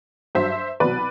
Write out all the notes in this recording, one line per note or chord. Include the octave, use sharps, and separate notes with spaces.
G2 F#3 C5 E5
C2 B2 F#3 B4 D5